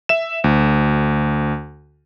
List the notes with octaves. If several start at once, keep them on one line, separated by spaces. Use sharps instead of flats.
E5 E7
D2